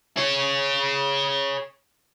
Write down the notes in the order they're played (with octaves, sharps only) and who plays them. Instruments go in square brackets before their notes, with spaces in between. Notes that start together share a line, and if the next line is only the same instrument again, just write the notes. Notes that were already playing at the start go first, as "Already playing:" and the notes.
[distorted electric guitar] G#4 C#5